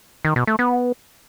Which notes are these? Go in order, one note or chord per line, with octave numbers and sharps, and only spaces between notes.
D#3
B2
A3
B3